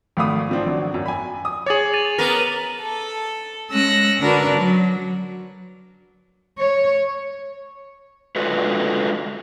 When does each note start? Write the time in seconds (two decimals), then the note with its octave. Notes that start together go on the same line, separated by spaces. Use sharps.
0.17 G#1 A3 F5 B5 D#6
0.49 F3 C4 D4
0.66 G#1 F#3 D4
0.94 F#2 F#3
1.06 G#5 B5
1.45 D#6
1.66 G#4 C#5 D6 A6 F#7
1.93 A6 D#7 F7
2.18 B3 A#4
2.80 A4
3.70 G#3 C#4 E6 F#6 A#6
4.19 D3 D4 F#4 A#4 B4
4.54 F#3
6.58 C#5
8.36 D3 G#3 F4 F#4 A4 B4